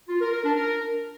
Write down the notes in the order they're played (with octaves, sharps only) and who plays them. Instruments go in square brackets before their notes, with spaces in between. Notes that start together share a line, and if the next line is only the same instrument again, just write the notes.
[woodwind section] F4
A#4
A#4
D4
A#4